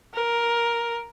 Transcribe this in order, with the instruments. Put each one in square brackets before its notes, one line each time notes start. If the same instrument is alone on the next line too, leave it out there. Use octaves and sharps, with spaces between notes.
[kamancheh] A#4